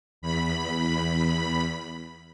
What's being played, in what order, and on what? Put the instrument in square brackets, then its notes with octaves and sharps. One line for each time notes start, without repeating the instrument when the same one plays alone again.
[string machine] E2 B5